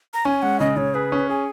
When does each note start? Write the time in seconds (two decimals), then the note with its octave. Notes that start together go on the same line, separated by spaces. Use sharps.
0.14 A#5
0.25 C#4 G#5
0.42 G#3 F#5
0.60 C#3 D#5
0.77 C#3 C#5
0.94 G#4 B4
1.12 C#4
1.29 G#4 G#5